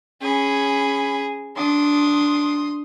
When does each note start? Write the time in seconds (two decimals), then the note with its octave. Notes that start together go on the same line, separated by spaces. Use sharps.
0.21 C#4 G#4 B5
1.57 D4 C6 D#6